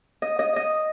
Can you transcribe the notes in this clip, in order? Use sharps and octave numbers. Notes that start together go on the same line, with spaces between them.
D#5
D#5
D#5